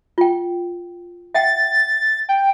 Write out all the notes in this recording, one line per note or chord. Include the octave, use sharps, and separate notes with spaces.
F4 G5
E5 F#5 G5 A6
G5